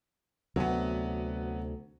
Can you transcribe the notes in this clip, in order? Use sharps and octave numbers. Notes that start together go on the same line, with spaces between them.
D2 C3 F#3 B3